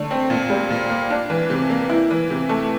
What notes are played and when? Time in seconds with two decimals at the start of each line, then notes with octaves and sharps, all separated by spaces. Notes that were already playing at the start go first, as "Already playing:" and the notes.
Already playing: D3 A3
0.11 C4
0.30 A#2
0.50 G3
0.70 A#2
0.90 A#3
1.10 D4
1.30 E3
1.50 C3
1.70 A#3
1.90 E4
2.11 E3
2.30 C3
2.49 A3